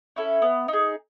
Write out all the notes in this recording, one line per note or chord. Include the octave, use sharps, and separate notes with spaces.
C#4 E4 A4
B3
D#4
G#4